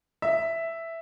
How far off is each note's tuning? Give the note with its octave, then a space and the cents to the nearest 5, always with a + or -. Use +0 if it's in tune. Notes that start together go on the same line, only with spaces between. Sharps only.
E5 +0